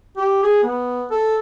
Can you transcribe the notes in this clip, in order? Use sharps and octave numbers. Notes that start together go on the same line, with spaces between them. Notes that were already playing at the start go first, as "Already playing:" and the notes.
G4
G#4
B3
A4